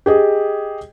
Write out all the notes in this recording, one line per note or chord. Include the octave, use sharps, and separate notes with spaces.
G4 G#4 D#5